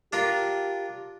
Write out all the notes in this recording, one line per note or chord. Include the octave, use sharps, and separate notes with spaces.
D4 F4 G4 A#4